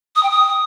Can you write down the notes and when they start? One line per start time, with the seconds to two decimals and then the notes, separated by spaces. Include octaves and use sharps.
0.16 D#6
0.23 G5
0.31 D#6